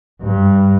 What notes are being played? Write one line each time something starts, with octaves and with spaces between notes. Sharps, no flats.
G2